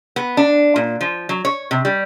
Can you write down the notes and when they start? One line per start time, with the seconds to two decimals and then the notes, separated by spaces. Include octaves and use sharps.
0.16 B3
0.37 D4
0.76 A#2
1.01 F3
1.29 F#3
1.45 C#5
1.71 C3
1.85 G3